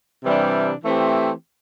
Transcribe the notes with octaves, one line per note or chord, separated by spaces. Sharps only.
C3 E3 G3 D4
E3 A3 C4 G4